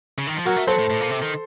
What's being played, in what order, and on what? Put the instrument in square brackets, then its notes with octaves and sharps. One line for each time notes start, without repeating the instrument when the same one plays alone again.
[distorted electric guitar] C#3
D#3
F3
[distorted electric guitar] F#3 [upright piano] F#4 A#4
[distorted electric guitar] A3
[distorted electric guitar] F#3 [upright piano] A4 C5
[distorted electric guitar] A2
A2
A#2
C3
D#3